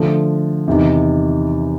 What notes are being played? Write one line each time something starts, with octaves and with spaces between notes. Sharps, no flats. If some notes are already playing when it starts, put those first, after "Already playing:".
Already playing: D3 F3 A3
E2 C3 D#3